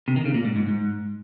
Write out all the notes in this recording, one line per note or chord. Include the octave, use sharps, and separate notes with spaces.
C3
D#3
C#3
A#2
G#2
G#2
G#2